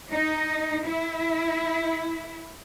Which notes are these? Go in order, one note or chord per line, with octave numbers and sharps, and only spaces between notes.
D#4
E4